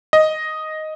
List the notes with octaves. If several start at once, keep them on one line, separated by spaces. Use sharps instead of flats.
D#5